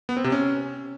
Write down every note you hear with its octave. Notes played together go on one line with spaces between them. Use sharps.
B3
C4
C3
C#4